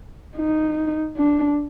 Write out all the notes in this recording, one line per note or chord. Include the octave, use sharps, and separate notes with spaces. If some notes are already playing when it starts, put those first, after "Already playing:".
D#4
D4